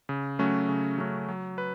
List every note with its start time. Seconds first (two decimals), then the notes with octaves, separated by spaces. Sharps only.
0.09 C#3
0.39 F#3 A3 C#4 F#4
0.69 C#3
0.98 F#3 A3 C#4 F#4
1.28 F#3
1.58 B4